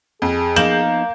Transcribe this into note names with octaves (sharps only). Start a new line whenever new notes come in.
F2 G#4
F3 A#3 B3 D#4 G6 E7 F#7